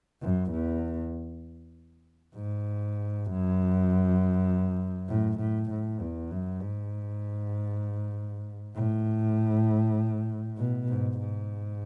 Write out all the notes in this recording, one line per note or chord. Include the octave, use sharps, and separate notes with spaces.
F#2
E2
G#2
F#2
A2
A2
A2
E2
F#2
G#2
A2
B2
G#2
G#2